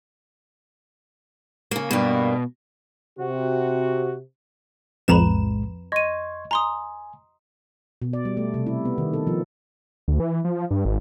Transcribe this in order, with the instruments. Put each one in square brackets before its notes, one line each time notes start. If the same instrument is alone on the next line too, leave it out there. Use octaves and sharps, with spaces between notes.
[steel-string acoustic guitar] C#3 A#3
[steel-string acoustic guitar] G2 A#3 [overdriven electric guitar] B2
[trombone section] C3 [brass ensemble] F#4
[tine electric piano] B1 A2 G#3 [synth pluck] F2 E7 [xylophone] B4 A#5 B5
[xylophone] D#5 D#7 [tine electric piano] C6 C#6 G#6
[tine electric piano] G#5 [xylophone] A#5 C6 D#6
[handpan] B2
D5
G3
A3
C3
E4
B3
D#3
A4
F3
[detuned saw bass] D2
E3
F3
G2
G#1